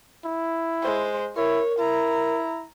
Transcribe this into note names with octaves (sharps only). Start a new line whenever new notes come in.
E4
G#3 C5
E4 A#4 C#5
E4 A#5